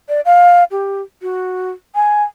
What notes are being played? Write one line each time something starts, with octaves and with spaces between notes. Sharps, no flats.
D5
F5
G4
F#4
G#5